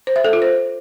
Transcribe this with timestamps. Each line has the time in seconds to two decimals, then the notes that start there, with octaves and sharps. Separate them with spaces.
0.07 C5
0.16 E5
0.24 A4
0.33 F4
0.42 C5